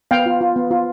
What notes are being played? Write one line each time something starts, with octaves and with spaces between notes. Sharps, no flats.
B3 F5 G5
F4
F4
B3
F4